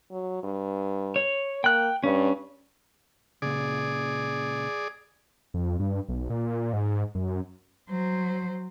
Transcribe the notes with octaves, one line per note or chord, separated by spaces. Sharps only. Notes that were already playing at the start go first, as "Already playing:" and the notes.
F#3
G2
C#5
A#3 G5 F#6
G2 C#4
C#2 A#2 C#3 G#4 D5
F2
G2
B1
A#2
G#2
F#2
F#3 C5